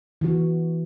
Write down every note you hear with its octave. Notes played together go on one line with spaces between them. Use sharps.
E3 F#4